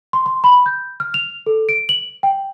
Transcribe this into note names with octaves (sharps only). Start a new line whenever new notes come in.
C6
C6
B5
G6
F6
F7
A4
D7
F#7
G5